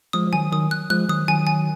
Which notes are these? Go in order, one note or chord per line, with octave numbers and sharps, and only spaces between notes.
F3 G#3 D#6
F3
D#3 F#3 G#5
D#3 F#3 D#6
F#6
F3 G#3 F#6
D#3 F#3 D#6
D#3 F#3 G#5
G#5